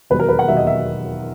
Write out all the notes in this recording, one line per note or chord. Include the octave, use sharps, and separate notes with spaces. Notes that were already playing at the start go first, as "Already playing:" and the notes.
E1 D#2 D#3 F#3 B3 B4
A#4
B4
F#5
E1 D#2 D#3 F#3 B3 E5
D#5
E5